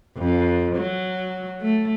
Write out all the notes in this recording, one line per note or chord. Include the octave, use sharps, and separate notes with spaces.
F2
F#3
A3